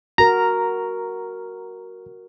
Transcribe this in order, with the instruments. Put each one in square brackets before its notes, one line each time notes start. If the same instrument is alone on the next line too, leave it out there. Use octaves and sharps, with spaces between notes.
[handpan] F#4 A#4 [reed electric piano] A#5